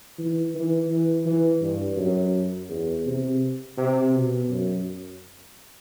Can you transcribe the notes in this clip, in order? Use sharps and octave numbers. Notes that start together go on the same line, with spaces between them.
E3
E3
E3
E3
G2
F#2
E2
C3
C3
B2
F#2